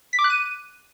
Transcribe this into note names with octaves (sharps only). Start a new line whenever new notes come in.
B6
D6
F#6
D#7